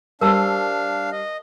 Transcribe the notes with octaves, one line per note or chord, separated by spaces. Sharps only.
G3 D4 A#4 C5 F5 A5 E6
D#5